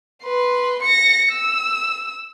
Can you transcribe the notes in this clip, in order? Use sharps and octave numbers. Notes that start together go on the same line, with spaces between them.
B4 C6
A#6 C#7
E6